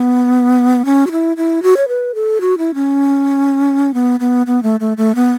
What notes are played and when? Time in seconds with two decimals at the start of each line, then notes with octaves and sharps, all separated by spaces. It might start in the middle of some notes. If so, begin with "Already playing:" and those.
Already playing: B3
0.85 C#4
1.07 F#4
1.12 E4
1.37 E4
1.63 F#4
1.77 C#5
1.88 B4
2.15 A4
2.41 F#4
2.58 E4
2.74 C#4
3.94 B3
4.20 B3
4.47 B3
4.63 A3
4.80 A3
4.97 A3
5.15 B3